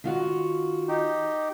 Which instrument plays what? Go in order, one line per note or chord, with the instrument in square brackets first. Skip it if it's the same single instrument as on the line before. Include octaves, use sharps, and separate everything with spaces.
[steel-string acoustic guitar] D#3 F4 F#4
[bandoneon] D#4 G4